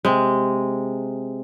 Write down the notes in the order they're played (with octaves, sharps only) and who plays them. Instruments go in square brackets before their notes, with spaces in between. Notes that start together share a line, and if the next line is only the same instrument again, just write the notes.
[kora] C3 G#3